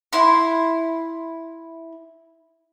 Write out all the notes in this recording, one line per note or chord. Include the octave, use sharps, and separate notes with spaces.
E4 C6